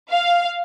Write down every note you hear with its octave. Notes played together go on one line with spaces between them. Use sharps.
F5